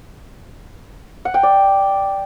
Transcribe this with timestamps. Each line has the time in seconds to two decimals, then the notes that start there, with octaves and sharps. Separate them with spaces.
1.25 F#5
1.34 G5
1.43 D5